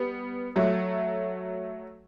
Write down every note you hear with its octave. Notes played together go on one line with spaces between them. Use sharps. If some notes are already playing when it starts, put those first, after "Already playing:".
Already playing: G3 B3
F#3 A3